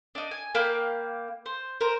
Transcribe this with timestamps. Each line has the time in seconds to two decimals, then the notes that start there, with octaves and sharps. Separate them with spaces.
0.15 D4 D#4
0.31 G#5
0.55 A#3 F5 G5 B5
1.46 C5
1.81 A#4 C5